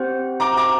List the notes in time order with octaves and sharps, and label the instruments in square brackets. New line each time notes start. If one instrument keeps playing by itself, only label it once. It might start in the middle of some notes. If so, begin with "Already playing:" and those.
Already playing: [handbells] C4 G4 C5 F#5
[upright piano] A#5 D6
A#5 D6